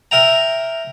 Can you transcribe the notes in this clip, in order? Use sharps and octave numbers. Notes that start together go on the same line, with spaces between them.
A#4 E5 G5 A#5